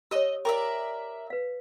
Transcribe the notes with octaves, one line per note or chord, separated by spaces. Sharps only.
G4 C#5 D#5 E6
A#4 D5 E5 G5
B4 F5